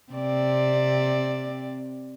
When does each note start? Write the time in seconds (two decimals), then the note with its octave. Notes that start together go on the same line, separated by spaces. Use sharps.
0.12 C3 C4 D5